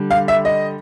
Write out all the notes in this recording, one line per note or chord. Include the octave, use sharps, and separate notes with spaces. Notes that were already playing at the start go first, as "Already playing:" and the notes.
Already playing: D3 G3
F5
E5
D#5